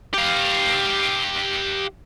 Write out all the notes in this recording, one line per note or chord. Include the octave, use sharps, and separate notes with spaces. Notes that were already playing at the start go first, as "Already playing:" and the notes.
G4 F5